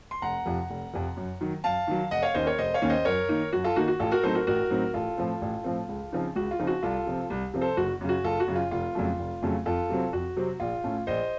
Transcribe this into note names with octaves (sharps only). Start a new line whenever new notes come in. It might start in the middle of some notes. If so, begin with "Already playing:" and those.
C6
F1 F#5 A#5
F2 C3 F3
F1
F2 C3 F3
F#2
D#3 F#3
F#2 F5 A5
D#3 F#3
F1 D#5 F#5
C#5 F5
D#2 D#3 A#3 C#4 C5 D#5
A#4 C#5
F1 C5 D#5
C#5 F5
D#2 D#3 A#3 C#4
C5 D#5
F#2 A#4 C#5
D#3 A#3 D#4
F#2 F#4
F4 A4
D#3 A#3 D#4 F#4
F#4
A1 F4 A4
F#4 A#4
A2 F#3 C4 D#4 A4 C5
F#4 A#4
A1 F#4 A#4
A2 F#3 C4 D#4
A1 F4 A4
A2 F3 C4
A1
A2 F3 C4
C#2
C#3 F3 C4 D#4
C#2 F#4
F4
C#3 F3 C4 D#4
F#4
C2 F4 A4
C3 F3 C4
C2
C3 F3 C4
A4 C5
F#1 F#4
F#2 C#3
F#4
F#1 F4 A4
F#4
F#2 C#3
F4
F1 F4
F2 C#3 F#3 A3
F1
F2 C#3 F#3 A3
F2 F4 A4
C3 F#3 C4
F2 F#4
C3 F#3 C4
A#1 F4
A2 A3 C#4
A#1 C5 D#5